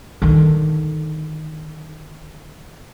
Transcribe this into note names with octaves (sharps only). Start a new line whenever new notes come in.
D3 D#3